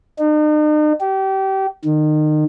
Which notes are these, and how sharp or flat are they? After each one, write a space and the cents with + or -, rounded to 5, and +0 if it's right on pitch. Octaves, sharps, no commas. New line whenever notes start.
D#4 -45
G4 -30
D#3 -30